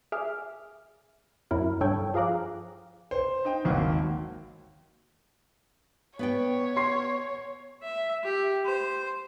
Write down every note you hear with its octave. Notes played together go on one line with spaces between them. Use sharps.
G#4 E5 D6 F6
F#2 F#3 E4 A#4
G2 A4 C#5 G5 G#6
F3 G#4 F5 A#5 D6 F#6
C5
D#4 G5
G#1 D#2 F#3 A#3 F#4
B3 C#5 D5 G5
C6 C7
E5
G4
C5